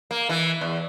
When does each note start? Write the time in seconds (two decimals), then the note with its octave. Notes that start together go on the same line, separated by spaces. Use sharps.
0.11 A#3
0.29 E3
0.61 E2